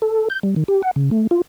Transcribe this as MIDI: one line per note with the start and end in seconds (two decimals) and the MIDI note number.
0.02 0.28 69
0.30 0.39 91
0.43 0.55 55
0.56 0.64 51
0.68 0.82 67
0.83 0.91 78
0.96 1.10 49
1.11 1.27 57
1.31 1.41 65